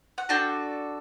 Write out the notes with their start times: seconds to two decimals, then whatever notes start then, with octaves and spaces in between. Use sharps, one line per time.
0.18 F#5
0.29 D4 F#4 A4 G5